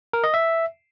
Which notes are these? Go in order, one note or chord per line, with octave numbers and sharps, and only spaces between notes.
A#4
D#5
E5